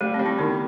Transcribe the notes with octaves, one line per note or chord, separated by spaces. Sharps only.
G3 A3
C4
G3
C4 E4
D#3 B3 D#4